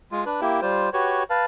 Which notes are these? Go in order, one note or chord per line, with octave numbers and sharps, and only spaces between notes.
G#3 F4
D4 B4
A#3 E4 G4
G3 F4 C5
F#4 G4 B4 C#5
B4 F5 A5